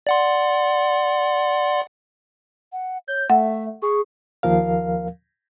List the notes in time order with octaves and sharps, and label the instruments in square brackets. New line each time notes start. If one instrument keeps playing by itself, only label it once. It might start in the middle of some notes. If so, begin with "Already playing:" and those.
[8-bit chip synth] D5 F#5 C6
[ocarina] F#5
[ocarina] C#5 [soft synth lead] G6
[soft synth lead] A3 [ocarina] E5 [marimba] F#5
[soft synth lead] G#4 [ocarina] C#6
[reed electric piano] D#2 F3 A#4 F5